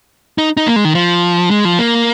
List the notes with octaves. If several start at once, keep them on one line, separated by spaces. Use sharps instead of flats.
D#4
D#4
A#3
G#3
D#3
F3
G#3
F3
A#3